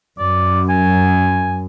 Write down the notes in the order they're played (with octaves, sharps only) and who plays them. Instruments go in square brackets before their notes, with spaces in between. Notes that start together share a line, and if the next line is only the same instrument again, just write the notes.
[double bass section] F#2 [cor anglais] D5
[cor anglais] G#5